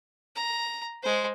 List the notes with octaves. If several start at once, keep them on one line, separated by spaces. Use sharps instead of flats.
A#5
G#3 C5